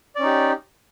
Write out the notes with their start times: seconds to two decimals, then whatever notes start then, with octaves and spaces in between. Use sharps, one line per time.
0.16 D5
0.19 C#4
0.23 D#4
0.26 G4